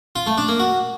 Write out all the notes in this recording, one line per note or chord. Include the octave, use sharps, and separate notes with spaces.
F4
A3
D4
A#3
F#4